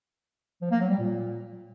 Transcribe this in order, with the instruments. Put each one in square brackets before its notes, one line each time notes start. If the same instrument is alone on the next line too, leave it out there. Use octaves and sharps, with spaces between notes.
[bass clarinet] F3
A#3
F#3
G3
A#2